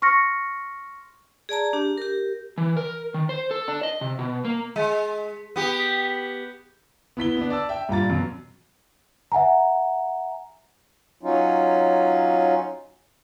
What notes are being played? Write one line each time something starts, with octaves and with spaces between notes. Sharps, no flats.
C6 C#6 F6 A#6 C#7
G#4 D5 A5 A#5
D4 G4
G4 A#4
E3
A#4
D#3
C5
A4
D4
D#5
C3
B2
A#3
G#3
B3 G4
B3 E4 B6 G7
B3 D4
D5 A5 E6
E5 G5
G2 A#2 A#5 A6
F#2 B2
E5 F#5 G#5 A#5
F#3 C#4 D#4 F4